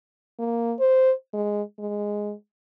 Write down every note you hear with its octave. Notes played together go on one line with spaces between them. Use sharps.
A#3
C5
G#3
G#3